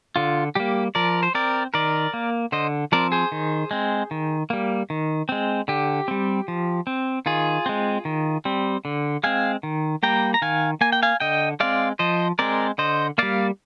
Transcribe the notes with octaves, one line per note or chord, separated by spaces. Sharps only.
D3 F4
G3 A#3 G4
F3 A#4 D5
C5
C4 A#4 D5
D#3 A#4 D5
A#3
D3 C5 D#5
F3 C4 A#4 D5
G#4 C5
D#3
G#3 C4
D#3
G3 A#3
D#3
G#3 C4
D3 G4
G3 C4
F3
C4
D#3 F4 G#4
G#3 C4
D#3
G3 C4
D3
G#3 C4 F5 G#5
D#3
G3 A#3 G5 A#5
A#5
D#3 F5 G#5
A#3 G#5
G5
F5 G#5
D3 D#5 G5
G#3 C4 D5 F5
F3 C5 D#5
G#3 C4 A#4 D5
D3 C5 D#5
G3 A#3 D5 F5